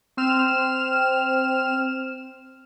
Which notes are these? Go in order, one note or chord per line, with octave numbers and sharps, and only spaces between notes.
C4 F6 E7